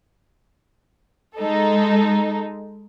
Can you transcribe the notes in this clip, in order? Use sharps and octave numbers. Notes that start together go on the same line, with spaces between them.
G#3 D#4 A4